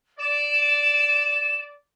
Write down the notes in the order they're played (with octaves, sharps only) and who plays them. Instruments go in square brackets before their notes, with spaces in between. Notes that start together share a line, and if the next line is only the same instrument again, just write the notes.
[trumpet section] D5 [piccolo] E7